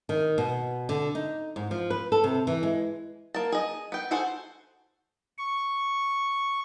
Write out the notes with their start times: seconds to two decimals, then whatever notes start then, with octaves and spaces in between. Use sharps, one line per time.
0.09 D#3
0.38 B2
0.89 D3
1.15 D#4
1.56 G#2
1.71 F3
1.90 B4
2.12 A4
2.24 C3
2.47 E3
2.63 G#3
3.34 A#3 A5
3.52 G#4 D#5
3.92 B3 G5
4.11 F#4 G#4 A4 C5 F#5
5.38 C#6